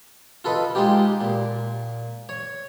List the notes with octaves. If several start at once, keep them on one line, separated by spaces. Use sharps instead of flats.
F4 A4 B4 D#5
G#3 D#4 F4 G4
A#2
C#5